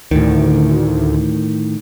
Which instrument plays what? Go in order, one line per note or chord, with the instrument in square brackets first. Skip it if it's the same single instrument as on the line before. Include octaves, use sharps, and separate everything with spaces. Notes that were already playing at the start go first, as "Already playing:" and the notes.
[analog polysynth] D2 [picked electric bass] A2 D#3